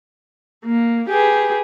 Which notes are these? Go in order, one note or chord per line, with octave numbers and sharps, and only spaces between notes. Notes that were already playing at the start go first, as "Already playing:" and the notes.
A#3
G4 G#4 B4